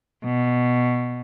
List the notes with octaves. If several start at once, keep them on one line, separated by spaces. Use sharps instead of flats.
B2